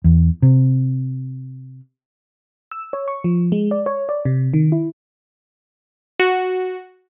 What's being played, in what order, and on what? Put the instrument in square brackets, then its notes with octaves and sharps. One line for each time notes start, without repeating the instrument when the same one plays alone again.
[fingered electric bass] E2
C3
[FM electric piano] E6
C#5
C#6
F3
G#3
D5
C#5
D5
C3
D#3
E4
[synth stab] F#4